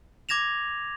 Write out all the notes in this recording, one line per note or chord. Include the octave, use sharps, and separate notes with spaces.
D6 G#6 A#6 E7 F7